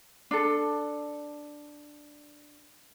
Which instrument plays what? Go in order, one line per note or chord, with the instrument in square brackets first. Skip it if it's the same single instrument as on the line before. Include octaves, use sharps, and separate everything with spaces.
[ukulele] D4 A4